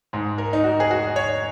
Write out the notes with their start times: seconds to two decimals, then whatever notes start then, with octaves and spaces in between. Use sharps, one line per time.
0.13 G#2 G#3
0.38 A#4
0.53 D#4
0.64 F#4
0.80 G#4
0.91 F#4
1.16 C#5